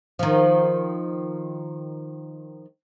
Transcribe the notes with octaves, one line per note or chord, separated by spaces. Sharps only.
D#3 F3